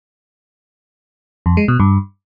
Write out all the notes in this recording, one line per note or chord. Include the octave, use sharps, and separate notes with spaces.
F2
G#3
B2
G2